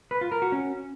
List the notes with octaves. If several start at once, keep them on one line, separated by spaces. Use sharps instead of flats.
B4
F4
A#4
F#4
C#4